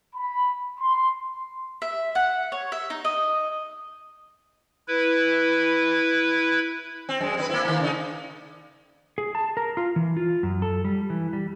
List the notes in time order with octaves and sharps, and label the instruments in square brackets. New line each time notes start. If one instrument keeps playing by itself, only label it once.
[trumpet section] B5
C6
[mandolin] E5
F#5
C#5
E5
D#4
D#5
[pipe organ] E4 B4
[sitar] C4
F#2 G#3
C4 D4 B4
A#3 C4 E4
D#3 A#3
C#3 D#4
[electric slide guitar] G#4
A5
A#4
F4
E3
F4
F#2
A4
G3
E3
G3